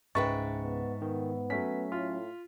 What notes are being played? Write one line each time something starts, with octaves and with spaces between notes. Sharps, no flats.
C#2 G#2 C#3 B4 E5 G5 C#6 A6
B3
D#3 B3
F#3 A3 C#4 B6
A2 F4